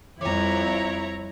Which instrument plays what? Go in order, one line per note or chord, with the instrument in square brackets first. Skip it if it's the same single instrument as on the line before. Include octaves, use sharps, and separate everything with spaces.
[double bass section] F2 [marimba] G3 D6 [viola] E4 [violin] C#5 A#5